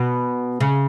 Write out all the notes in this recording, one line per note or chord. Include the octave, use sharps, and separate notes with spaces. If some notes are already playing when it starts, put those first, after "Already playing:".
Already playing: B2
C#3